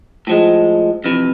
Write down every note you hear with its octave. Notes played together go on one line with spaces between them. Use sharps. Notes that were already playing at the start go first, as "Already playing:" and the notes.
A2 F3 G#3
F2 C3 E3